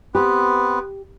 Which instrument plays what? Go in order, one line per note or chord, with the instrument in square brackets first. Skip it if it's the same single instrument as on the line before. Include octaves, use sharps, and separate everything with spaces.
[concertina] B3 C4 B4 [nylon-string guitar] G4